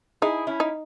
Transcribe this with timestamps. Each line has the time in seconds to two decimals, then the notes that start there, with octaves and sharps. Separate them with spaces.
0.22 D#4 E4 G#4
0.47 C#4 E4
0.60 D#4